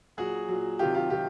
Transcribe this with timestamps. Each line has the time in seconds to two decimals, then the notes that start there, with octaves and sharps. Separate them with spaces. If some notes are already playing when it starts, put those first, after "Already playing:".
0.17 A#2 F#3 F#4 G#4
0.48 A#2 F#3
0.79 C3 D#3 F#3 F4 G4
0.95 F4 G4
1.10 C3 D#3 F#3 F4 G4